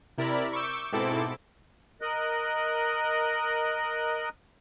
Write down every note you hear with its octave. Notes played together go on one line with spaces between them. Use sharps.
C3 E4 A#4 D5 B5
C#6 D6 E6 G6
G#2 B2 C4 E4 A4 D6
A#4 D#5 F#6